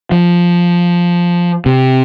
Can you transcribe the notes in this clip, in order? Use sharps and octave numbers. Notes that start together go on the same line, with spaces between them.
F3
C3